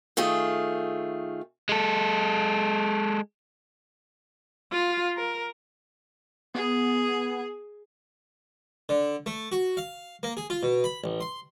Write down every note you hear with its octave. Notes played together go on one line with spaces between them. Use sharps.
D#3 A3 F4 G#4
G#3 A4
F4
A#4
B3 G#4
D3
A3
F#4
F5
A#3
G#4
F4
B2
B5
A1
C6